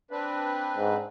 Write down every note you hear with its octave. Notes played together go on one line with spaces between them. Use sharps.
C4 D4 B4
G#2